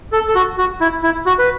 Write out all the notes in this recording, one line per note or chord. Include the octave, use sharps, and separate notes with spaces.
A4
A4
F#4
F#4
E4
E4
F#4
B4